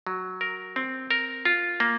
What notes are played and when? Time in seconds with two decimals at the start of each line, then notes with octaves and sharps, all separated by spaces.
0.07 F#3
0.41 A#4
0.76 C4
1.11 A#4
1.45 F4
1.80 A#3